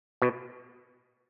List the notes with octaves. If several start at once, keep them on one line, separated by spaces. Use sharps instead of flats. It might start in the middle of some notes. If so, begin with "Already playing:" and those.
B2